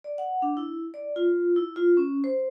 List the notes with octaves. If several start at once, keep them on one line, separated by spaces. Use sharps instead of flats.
D5
F#5
D4
E4
D5
F4
E4
F4
C#4
C5